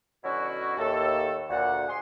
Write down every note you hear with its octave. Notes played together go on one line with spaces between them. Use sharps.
B2 D3 F#3 C#4 E4 F#4
D#2 A2 A4
D2 A#2 F#5
G#4 G#5 C6